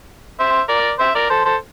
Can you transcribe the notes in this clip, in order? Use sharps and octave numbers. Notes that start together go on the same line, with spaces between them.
C5 E5
A#4 D5
C5 E5
A#4 D5
A4 C5
A4 C5